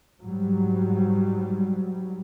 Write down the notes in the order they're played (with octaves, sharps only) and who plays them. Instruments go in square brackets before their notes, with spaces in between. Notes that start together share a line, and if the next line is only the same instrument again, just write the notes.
[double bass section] G#2 F#3 G3